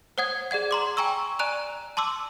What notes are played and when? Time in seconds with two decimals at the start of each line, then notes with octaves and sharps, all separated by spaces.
0.18 C5 C#5 F#5 D#6 G#6
0.51 G#4 D5 F#5 G#6
0.71 A#5 C6 D6
0.97 G5 G#5 A#5 C#6 E6
1.39 D5 G#5 A#5 F#6 D#7 F7
1.97 A5 C6 D6 E6